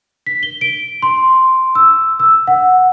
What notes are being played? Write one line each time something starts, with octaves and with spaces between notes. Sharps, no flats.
B6
G7
D7
C6
E6
E6
F#5